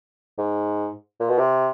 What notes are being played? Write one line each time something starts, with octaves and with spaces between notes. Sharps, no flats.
G#2
A#2
B2
C3